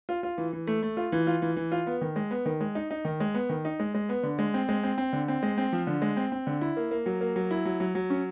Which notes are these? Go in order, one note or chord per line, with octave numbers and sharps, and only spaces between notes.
F4
F4
E3
E3
A3
A3
F4
E3
F4
E3
E3
F4
B3
D#3
G#3
B3
D#3
G#3
D#4
D#4
D#3
G#3
B3
D#3
D#4
G#3
G#3
B3
D3
G#3
C4
G#3
C4
C4
D3
C4
G#3
C4
F3
D3
G#3
C4
C4
D3
E4
A#3
A#3
F#3
A#3
F#3
E4
F#3
F#3
F#3
C#4